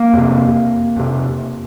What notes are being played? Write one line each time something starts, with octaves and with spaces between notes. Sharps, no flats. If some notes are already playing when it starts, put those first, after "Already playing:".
Already playing: A#3
F2 C3
F2 C3